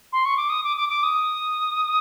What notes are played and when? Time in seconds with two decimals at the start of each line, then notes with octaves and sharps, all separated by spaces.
0.13 C6
0.25 C#6
0.37 D6
0.50 D#6
0.64 D6
0.77 D6
0.89 D6
1.03 D#6